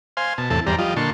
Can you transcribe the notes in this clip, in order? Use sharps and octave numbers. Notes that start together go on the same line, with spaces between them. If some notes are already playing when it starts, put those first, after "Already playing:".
C5 F5 G#5 C6
B2 A5
E2 A2 C3 A4 A5
E2 G2 G3 C5 D5 A#5
F3 G3 F4 D#5
A#2 D3 A5 C6 C#6